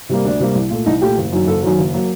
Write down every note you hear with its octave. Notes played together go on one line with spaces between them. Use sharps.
C3 G3 A#3
D2 D4
C3 G3 A#3
C2
A#2 A3
C2 D#4
A#2 A3 G4
F#1
F#2 D#3 F#3
F#1 A4
F#2 D#3 F#3
F#1
F#3 A#3